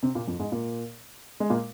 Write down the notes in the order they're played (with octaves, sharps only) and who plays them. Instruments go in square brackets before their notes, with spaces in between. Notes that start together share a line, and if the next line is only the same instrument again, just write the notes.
[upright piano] C3 C4
A#2 A#3
F2 F3
G#2 G#3
A#2 A#3
G#3
A#2 A#3